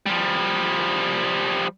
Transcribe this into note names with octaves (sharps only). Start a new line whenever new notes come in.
F3 G3